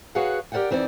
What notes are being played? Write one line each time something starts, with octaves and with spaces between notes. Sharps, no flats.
F#4 G#4 B4 C#5 F5 F#5
G4 A#4 C5 D5 F#5 G5
F2 E3 C4 D#4 E4 D5